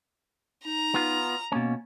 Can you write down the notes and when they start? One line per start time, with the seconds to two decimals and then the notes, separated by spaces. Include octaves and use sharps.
0.65 D#4 A#5
0.94 B3 F4
1.52 B2 A#3 C#4